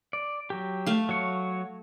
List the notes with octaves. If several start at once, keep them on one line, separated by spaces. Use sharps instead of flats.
D5
F#3 G4
A3 F5
F#3 C#5